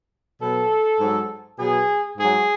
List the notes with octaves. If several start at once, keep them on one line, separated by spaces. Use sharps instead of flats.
B2 F#3 A4
G#2 F#3
B2 F#3 G#4
G#2 F#3 G#4